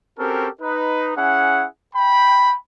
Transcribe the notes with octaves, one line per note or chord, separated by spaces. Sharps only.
C4 C#4 F#4 G4 A4 A#4
D#4 B4
C#4 E4 G#4 F#5
G5 B5